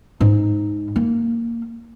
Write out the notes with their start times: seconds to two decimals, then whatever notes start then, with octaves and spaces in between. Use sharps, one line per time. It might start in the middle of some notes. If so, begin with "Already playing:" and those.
0.20 G#2 D#4
0.96 A#3